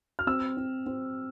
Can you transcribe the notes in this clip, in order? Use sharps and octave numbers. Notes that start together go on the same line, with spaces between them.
F6
C4 E6
C4
C4